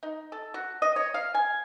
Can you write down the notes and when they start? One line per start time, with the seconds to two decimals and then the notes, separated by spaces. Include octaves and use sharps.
0.03 D#4
0.32 A4
0.54 F#4
0.82 D#5
0.96 C#5
1.14 F5
1.34 G#5